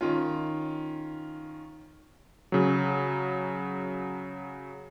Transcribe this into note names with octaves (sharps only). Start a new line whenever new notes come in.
D#3 C#4 F4
C#3 F#3